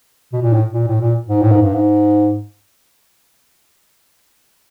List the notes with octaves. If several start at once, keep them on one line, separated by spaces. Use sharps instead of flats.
B2
A#2
A2
A#2
A2
A#2
G#2
A2
G#2
G2
G#2